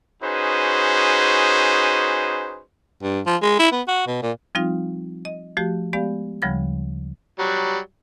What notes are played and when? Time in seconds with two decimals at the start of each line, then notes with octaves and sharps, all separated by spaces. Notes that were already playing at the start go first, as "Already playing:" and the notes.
0.22 C#4 D#4 F#4 G#4 B4 C5
3.03 G2
3.26 F3
3.42 G#3
3.59 E4
3.72 B3
3.88 F#4
4.07 B2
4.22 A#2
4.55 F3 G3 C4 D#4 F4 F5
5.25 D#5
5.57 F3 A3 F#4 G4
5.93 G#3 B3 G4 D5 F5
6.42 D2 C#3 F3 G3 B5 G#6
7.39 F#3 G3